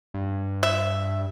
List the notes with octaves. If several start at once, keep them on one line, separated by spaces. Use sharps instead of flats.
G2
E5